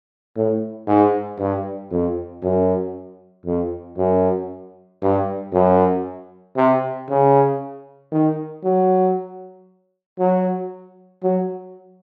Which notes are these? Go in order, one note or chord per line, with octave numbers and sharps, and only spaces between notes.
A2
G#2
G2
F2
F#2
F2
F#2
G2
F#2
C3
C#3
D#3
F#3
F#3
F#3